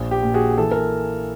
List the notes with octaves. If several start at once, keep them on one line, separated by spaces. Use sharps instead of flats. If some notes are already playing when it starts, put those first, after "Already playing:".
Already playing: A#1
G4
A#2
F#4 G#4
E3 A4
A#4